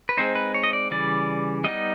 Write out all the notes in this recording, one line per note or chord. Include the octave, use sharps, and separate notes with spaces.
B4
G#3 C4 D#4 C5
B4
C#5
D#5
D5
C#3 E3 G3 D5
G3 B3 D#4 D#5